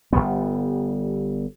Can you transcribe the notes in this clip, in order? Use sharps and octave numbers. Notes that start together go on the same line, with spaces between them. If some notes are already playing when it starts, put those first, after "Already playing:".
G1 D#2 G3 B3